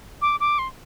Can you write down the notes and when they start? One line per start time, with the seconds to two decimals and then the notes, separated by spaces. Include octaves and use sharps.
0.22 D6
0.40 D6
0.59 C6